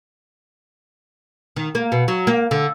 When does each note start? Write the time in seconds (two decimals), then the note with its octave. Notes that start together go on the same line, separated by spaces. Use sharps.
1.56 D#3
1.75 A#3
1.92 B2
2.08 F#3
2.27 A#3
2.51 D3